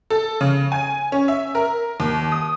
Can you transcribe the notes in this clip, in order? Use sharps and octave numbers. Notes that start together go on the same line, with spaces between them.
A4
C#3
G#5
C#4
E5
A#4
D#2
D#6